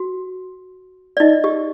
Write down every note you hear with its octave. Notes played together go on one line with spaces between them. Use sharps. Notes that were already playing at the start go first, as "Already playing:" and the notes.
Already playing: F#4
D5
D#4 D#5
G4